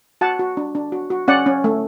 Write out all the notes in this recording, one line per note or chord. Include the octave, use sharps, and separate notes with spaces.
F#4 F#5 A5
F#4
D4
D4
F#4
F#4
C#4 D5 F#5
C#4
A3